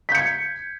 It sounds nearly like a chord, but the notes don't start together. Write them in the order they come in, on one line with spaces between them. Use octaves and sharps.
B6 G6 C#7 G#6